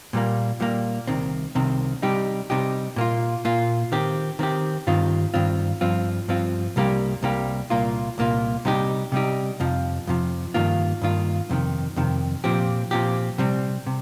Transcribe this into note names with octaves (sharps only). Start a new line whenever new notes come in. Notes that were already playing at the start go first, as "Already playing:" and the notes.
A#2 G3 A#3
A#2 G3 A#3
C2 C3 D#3 C4
C2 C3 D#3 C4
C3 G3 D#4 G4
C3 G3 D#4 G4
A#2 A#3 F4
A#2 A#3 F4
D#3 C4 G4
D#3 C4 G4
G2 D#3 C4 F4
G2 D#3 C4 F4
G2 F3 C4 F4
G2 F3 C4 F4
C2 C3 G3 A#3 G4
C2 C3 G3 A#3 G4
C2 A#2 A#3 F4
C2 A#2 A#3 F4
C3 G3 D#4 G4
C3 G3 D#4 G4
F2 C3 F3
F2 C3 F3
G2 D#3 A#3 F4
G2 D#3 A#3 F4
F2 C3 D#3
F2 C3 D#3
A#2 F3 C4 G4
A#2 F3 C4 G4
C3 G3 C4
C3